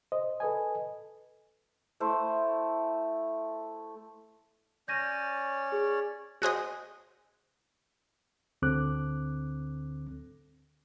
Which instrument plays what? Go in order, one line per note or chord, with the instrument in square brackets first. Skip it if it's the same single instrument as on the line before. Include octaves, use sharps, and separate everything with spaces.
[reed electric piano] C5 D#5
A4 B4 D#5 G#5
[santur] A3 E4 C5
[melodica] C#4 C#5 D5 [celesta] G6 A#6 D#7
[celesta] G#4
[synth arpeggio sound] F#4 G#4 C5 D#5
[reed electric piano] D2 D3 C4 A4 D6 F#6